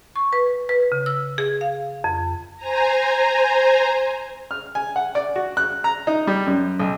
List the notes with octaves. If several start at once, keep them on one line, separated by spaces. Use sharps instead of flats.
C#6
B4
B4
C#3
E6
G#4
F5
F2
C5 G#5 A#5
F6
G#5
F#5
D5
F#4
F#6
A#5
D#4
G3
F#2
B1